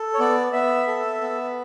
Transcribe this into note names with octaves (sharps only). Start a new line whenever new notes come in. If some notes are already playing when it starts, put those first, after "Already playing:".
Already playing: A4
C#5
B3 D5
B3 E5
A4
B3